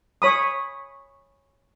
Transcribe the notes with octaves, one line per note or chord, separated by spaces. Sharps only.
C#5 B5 D#6